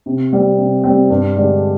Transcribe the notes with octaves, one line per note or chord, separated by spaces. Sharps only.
C3
G3 C4
C3
G3 C4
G2
D3 G#3 D4 G4